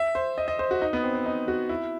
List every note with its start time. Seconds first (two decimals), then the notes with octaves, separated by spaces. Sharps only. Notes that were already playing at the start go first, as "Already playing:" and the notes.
Already playing: E5
0.15 C5
0.38 D#5
0.48 D#5
0.59 C5
0.71 F#4
0.82 D#4
0.93 B3
1.03 C4
1.15 C4
1.26 D#4
1.48 F#4
1.69 E4